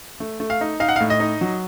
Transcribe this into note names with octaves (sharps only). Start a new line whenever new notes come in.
A3
A3
F5
D#4
D#4 F5
F#5
F5
A2
D#5
D#4
F#3